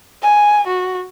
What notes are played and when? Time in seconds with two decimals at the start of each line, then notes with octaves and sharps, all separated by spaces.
0.22 G#5
0.67 F#4